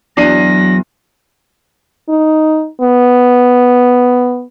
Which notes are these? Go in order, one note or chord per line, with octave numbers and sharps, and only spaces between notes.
E2 F#3 D4 A#6 C7 D#7
D#4
B3